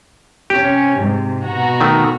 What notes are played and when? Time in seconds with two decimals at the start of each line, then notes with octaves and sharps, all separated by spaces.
0.50 C3 C#4 G4
0.97 G#2 C3
1.44 B2 F#4 A#5
1.80 D#3 A3